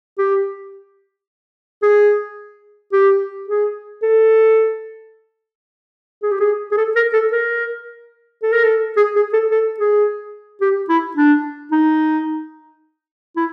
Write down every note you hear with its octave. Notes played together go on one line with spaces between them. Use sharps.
G4
G#4
G4
G#4
A4
G#4
G4
G#4
G#4
A4
A#4
A4
A#4
A4
A#4
A4
G#4
G#4
A4
A4
G#4
G4
E4
D4
D#4
E4